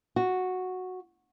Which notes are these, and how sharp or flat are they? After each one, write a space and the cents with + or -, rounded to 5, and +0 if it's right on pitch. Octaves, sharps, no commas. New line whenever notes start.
F#4 -5